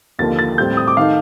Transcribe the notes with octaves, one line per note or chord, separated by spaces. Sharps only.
D#2 D3 F3 A#3 A6
A6
A2 G3 C4 G6
D#6
D6
D#3 A3 D#4 F5